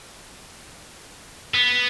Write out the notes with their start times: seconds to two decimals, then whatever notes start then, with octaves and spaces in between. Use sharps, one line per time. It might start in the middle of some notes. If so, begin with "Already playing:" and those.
1.54 B3